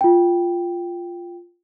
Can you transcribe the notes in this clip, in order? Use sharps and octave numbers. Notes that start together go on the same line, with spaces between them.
F4 G5